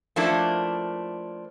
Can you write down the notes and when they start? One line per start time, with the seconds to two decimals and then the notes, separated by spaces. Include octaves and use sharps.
0.16 F3 A3 A#3 D4 E4